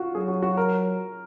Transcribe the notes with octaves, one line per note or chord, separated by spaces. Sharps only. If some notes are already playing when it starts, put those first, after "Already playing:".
Already playing: F4 F#4
F#3 G#4
F#4
F#4
A#4